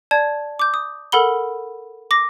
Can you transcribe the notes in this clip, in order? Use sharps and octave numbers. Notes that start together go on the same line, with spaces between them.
D5 A5 G#6
D6 G6
D#6
A4 A#4 F#5 B5 G7
D6 A#6